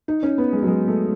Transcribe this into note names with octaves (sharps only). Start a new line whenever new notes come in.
D#4
C#4
B3
G#3
F#3
G#3
A3